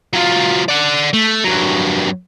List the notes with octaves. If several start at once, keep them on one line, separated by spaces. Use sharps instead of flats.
F#3 F4
D5 F#5
A3
G2 F#3